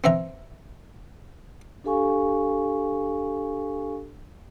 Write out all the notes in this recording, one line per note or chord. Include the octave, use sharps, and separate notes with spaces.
B3 C4 E5 A#5
D4 G4 A4 F5 G#5 C#6